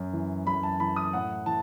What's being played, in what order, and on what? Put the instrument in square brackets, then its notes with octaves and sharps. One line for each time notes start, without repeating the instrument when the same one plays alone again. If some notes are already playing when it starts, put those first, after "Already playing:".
Already playing: [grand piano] F#2
E3
F#2 B5
A5
E3 B5
D#6
A2 F#5
E3 A5